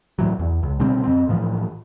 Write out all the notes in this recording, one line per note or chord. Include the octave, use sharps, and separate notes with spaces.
A2 E3 F#3
E2
C#2
B2 D3 G3 C4
F#2 C4
A2 E3 F3